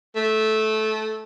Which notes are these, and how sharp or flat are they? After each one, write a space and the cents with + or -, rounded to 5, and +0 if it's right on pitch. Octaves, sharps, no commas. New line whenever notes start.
A3 -15